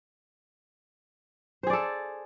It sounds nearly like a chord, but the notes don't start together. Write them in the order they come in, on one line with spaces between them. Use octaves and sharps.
C5 G#4 D5 A4